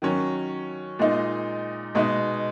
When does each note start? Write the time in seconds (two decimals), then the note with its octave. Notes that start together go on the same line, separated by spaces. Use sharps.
0.02 D#3 F#3 C#4
0.99 A#2 G#3 D#4
1.95 B2 G#3 D#4